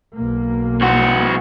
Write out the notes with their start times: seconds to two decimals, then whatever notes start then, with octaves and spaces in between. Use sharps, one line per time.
0.15 B1 A#3
0.81 C2 F#4